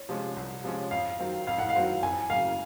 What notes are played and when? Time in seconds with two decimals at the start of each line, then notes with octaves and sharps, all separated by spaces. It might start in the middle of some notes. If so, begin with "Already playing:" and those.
Already playing: C#5
0.09 C3 F3 G#3 C#4
0.36 C2
0.64 C3 F3 G#3 C#4
0.91 F2 F5
1.19 D#3 F#3 C4 F4
1.47 F2 F5
1.58 F#5
1.69 F5
1.75 D#3 F#3 C4 F4
2.03 F2 G#5
2.29 C#3 F#3 A#3 F5